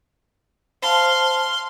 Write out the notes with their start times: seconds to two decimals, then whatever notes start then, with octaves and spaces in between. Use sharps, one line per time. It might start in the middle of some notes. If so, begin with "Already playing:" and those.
0.82 C5 F5 A5 C6